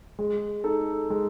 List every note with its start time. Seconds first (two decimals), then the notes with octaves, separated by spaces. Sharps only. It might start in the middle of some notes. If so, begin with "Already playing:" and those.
0.19 G#3
0.64 D#4 A4
1.10 G#3